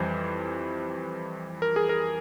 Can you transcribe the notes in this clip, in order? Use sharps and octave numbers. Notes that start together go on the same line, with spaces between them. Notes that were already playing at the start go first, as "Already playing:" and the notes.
Already playing: F2 E3 G3 C5
A#4
G#4
A#4